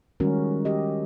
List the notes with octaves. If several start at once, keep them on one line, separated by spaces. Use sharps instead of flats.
D#3 G3 G#3 C#4 F#4 A#4
G4 D#5